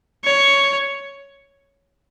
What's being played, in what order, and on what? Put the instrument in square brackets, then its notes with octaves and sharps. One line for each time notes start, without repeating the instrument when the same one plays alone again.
[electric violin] C#5